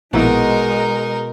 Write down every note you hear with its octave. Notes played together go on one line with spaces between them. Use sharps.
A#1 B2 G#3 A#3 D#4 E4 A#4